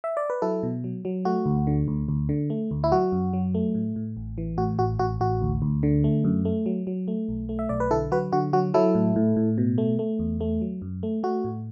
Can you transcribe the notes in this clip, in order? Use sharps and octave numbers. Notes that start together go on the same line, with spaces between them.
E5
D5
B4
F#3 E4 A4
B2
F#3
F#3
A3 F#4
D2
D3
D2
D2
D3
A3
D2
E4
F#3 F#4
F#2
F#3
A3
A2
A2
A1
E3
A2 F#4
A1 F#4
A1 F#4
A1 F#4
D2
D2
D3
A3
F#2
A3
F#3
F#3
A3
B1
A3
E5
B1 D5
B4
D3 E4 A4
F#3 F#4 B4
D3 F#4
F#3 F#4
F#3 E4 A4
A2
A2
A2
B2
A3
A3
E2
A3
F#3
F#2
A3
A3 F#4
A2